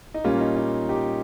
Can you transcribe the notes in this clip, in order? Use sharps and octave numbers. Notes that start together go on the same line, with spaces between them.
D#4
A#2 G3 A#3 C#4 F4
D#4
D#4
D#4 G4